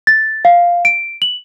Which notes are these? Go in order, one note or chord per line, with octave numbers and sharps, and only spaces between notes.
A6
F5
D7
F#7